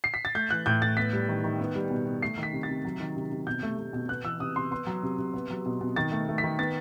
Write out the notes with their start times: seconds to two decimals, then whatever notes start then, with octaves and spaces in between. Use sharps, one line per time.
0.04 C7
0.14 B6
0.25 A6
0.35 A3 G6
0.50 E3 F#6
0.66 A2 G6
0.82 A2 A6
0.97 B3 B6
1.13 G3
1.28 D#3
1.44 D#3
1.60 B3
1.75 G3
1.90 B2
2.06 B2
2.22 A3 C7
2.37 D#3
2.43 B6
2.53 C3
2.63 A6
2.69 C3
2.85 F#3
3.00 D#3
3.16 C3
3.31 C3
3.47 B2 G6
3.63 A3
3.78 A3
3.93 B2
4.09 B3 F#6
4.24 E3 E6
4.40 C3 D#6
4.56 C3 C6
4.71 B3 C6
4.87 F#3
5.03 C3
5.18 C3
5.34 B3
5.50 F#3
5.66 B2
5.81 B2
5.96 D#3 A6
6.11 A3
6.28 A3
6.38 B6
6.44 D#3
6.59 B3 A6